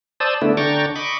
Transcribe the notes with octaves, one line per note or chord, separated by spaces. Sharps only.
C5 D5 A5 D#6 E6
D3 A3 B3 D4 E4
D3 D4 G5 A#5 C#6 A6
D#5 B5 C#6 D6